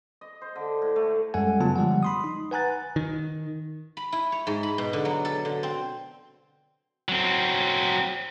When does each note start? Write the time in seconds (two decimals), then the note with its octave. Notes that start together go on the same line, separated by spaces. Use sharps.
0.21 D#5
0.41 C5
0.55 D3
0.82 A2
0.96 A3
1.34 F#2 G3 G#3 A4 F#5 G#5
1.60 C#3 F#3 A3 B3 F4 A5
1.76 D3 F3 G3 G#3 F#5
2.03 B5 C6 D#6
2.24 D#4
2.51 B4 F#5 G#5 A#5 F#6 A6
2.96 D#3
3.97 B5
4.12 E4
4.32 C#5
4.47 G#2
4.63 B5
4.78 B2
4.93 D3
5.05 F#3
5.25 A4
5.45 D3
5.63 C4
7.09 F#3 C4